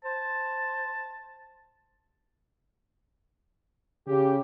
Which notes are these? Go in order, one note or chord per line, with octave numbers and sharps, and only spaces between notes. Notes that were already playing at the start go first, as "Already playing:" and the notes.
C5 A5
C#3 G4